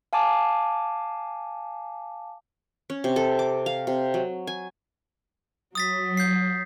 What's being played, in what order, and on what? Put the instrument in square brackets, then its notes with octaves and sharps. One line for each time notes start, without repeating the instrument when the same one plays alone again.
[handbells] F5 G#5 A5 D6
[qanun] C#4
C3
A4
D6
F5
C3
F#3
G#5
[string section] F#3 [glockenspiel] D#6 A6 B6
[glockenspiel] G6 C7